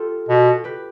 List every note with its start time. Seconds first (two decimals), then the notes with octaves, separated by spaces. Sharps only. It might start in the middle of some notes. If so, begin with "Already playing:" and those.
Already playing: F4 G4 A4
0.28 B2
0.64 G4 B4